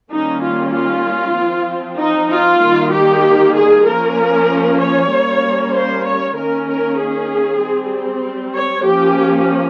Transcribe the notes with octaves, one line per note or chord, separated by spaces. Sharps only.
D#3 G3 A#3 C#4 D#4
F4
F4
F3 C4
D#4
F4
D#3 G3 A#3
G4
G#4
F3 A#3 C#4 A#4
C#5
G3 A#3 C#4
C5
C#5
D#3 A#3 C#4 A#4
A#4
G#4
G3 C4
C#5
F3 A#3 C#4 G4